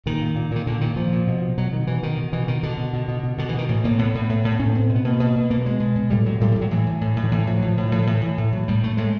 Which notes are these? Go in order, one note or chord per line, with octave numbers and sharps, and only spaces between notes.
A#2 D#3
A#2
A#2
A#2 D#3
A#2 D3
A#2 D#3
A#2 F3
A#2
B2
B2
B2 F#3
B2 D#3
B2 E3
B2 D#3
B2
B2 E3
B2 D#3
B2 D3
B2
B2
B2
B2
B2 D3
E3
B2 D#3
A2 E3
A2 A#3
A2 B3
A2
A2
A2
A2 C#4
B3
A2 C4
B2
B3
B2 A#3
B2
B2
B2 A#3
A3
B2 G#3
B2
B2
A2 G3
A2 F#3
A2 G3
A2 G3
F#3
A2 E3
A2
A2
A2
D#3
A2 E3
A2 F3
F#3
A2
F3
A2
E3
A2 F3
A2 E3
A2 E3
A2
A2 F#3
A2 G3
A2 A3
A2 G#3